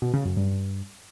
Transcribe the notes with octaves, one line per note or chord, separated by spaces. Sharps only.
B2
C#3
F#2
G2